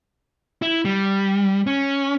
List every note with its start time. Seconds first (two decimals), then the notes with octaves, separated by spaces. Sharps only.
0.62 E4
0.85 G3
1.67 C#4